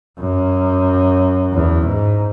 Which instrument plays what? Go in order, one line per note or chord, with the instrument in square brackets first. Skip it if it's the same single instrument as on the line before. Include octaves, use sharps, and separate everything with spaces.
[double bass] F#2
E2
G#2